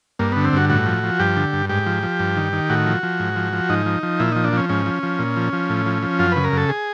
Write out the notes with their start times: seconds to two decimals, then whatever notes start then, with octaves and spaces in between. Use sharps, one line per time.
0.19 G2 A#3
0.32 D3 B3
0.45 C4
0.53 G2 F#4
0.70 A2 F#4
0.86 F3
1.03 F3
1.19 G2 G4
1.36 D3
1.53 G2
1.69 G#2 G4
1.86 F3
2.03 F3
2.19 G2
2.36 D#3
2.53 D#3
2.70 A2 F#4
2.86 F3
3.03 F3
3.20 G#2
3.36 F3
3.53 F3
3.69 G#2 D#4
3.86 F3
4.03 F3
4.19 A#2 E4
4.32 F3 D#4
4.44 D4
4.53 F3 C#4
4.69 G#2 C#4
4.86 F3
5.03 F3
5.19 A#2
5.36 F3
5.53 F3
5.70 A2
5.86 F3
6.02 F3
6.19 F#2 F4
6.32 C#3 B4
6.44 A#4
6.52 F#2 A4
6.69 G#4